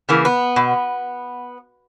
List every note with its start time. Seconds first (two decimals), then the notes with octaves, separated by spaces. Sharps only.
0.09 C#3 E3 A#3
0.25 B3
0.56 B2